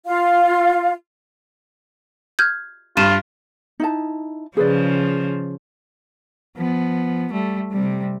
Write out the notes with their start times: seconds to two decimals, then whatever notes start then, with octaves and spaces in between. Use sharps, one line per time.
0.05 F4 F5
2.39 F6 G6 G#6
2.97 G2 F4 D#7 E7
3.80 D#4 E4 A5
4.57 C#3 F3 G#4 B4 D5
6.56 F3 B3
7.32 G3 A3
7.72 C3 G3